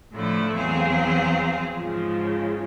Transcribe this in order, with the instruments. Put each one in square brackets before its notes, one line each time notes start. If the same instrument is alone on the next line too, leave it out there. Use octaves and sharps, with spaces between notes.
[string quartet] A2 D3 F3 A3 E4
E2 F#3 C4 G#4 F5
G#2 C#3 F3